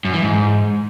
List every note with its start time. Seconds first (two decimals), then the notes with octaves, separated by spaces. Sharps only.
0.05 F#2
0.13 E3
0.22 G#2